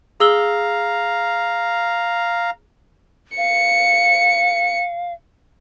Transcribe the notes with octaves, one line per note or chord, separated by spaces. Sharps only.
G#4 F5 A#5 E6 G7
F5 C#7